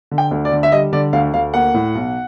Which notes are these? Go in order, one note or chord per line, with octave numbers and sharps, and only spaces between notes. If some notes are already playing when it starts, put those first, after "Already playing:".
D3
G5
D2
D5
D3
E5
G3 D#5
D3 D5
D2 F5
D2 F5
A#3 F#5
A2
B1